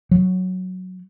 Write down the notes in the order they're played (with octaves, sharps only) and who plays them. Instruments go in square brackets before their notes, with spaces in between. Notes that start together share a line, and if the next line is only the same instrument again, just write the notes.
[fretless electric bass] F#3